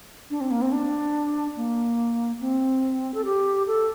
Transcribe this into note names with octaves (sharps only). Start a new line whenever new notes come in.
D4
C4
A#3
C4
D4
A#3
C4
A4
G4
A4